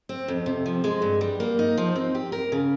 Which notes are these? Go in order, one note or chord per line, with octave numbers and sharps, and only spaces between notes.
C4
F2
C3
F3
G#3
G2
G3
A#3
D#4
F3
C4
G4
A#4
C#3